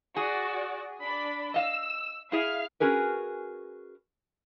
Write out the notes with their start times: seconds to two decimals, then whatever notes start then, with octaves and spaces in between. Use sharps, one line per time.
0.16 F#4 G#4 D5
1.02 D4 D5 B5
1.54 D#5 F5 E6
2.32 E4 G#4 E5 F5 F6
2.80 C#4 F#4 G#4 A#4 B4